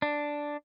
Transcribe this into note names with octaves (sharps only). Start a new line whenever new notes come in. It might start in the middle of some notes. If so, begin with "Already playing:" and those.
D4